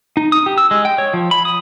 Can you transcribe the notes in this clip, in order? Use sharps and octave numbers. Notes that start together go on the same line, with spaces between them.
D#4
D#6
G4
E6
G#3
G5
C#5
F3
B5
D#6